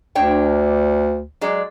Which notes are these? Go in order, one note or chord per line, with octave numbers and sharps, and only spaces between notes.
D2 D4 C#5 G5
F#3 G#3 D5